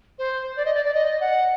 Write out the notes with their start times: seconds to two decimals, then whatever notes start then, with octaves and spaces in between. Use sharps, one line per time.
0.19 C5
0.56 D5
0.65 D#5
0.75 D5
0.85 D5
0.94 D#5
1.21 F#5